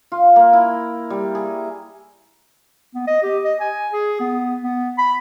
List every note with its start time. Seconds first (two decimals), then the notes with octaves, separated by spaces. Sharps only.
0.12 F4
0.36 A#3
0.53 E4
1.10 G3
1.35 G#4
2.94 B3
3.07 D#5
3.23 G4
3.44 D#5
3.60 G#5
3.93 G#4
4.20 B3
4.63 B3
4.98 B5